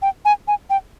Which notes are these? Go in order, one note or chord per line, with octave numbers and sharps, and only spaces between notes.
G5
G#5
G#5
G5